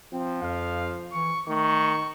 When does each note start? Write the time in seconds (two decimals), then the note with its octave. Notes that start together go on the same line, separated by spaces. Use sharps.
0.13 F3 C4
0.42 F2 F5
1.12 E3 C#6
1.48 D#3 A3 C#6